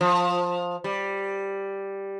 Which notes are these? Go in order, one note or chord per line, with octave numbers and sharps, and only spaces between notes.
F3
G3